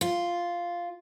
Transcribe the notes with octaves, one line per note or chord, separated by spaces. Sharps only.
F4